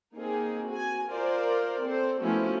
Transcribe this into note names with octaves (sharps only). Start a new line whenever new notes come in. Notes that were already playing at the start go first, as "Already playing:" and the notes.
A#3 C4 D#4 G#4
F#4 G#5
F4 A#4 C5 D5
C4 A4 C5
F3 A3 B3 C#4 E4 F#4